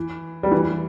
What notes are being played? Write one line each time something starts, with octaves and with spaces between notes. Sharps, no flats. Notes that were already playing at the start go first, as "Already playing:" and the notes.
Already playing: E3
G3
E3